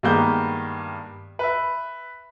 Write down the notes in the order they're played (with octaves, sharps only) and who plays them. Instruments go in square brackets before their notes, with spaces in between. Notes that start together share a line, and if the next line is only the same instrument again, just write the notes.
[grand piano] G2 D#3 G#3 A#3 B3 G6
B4 E5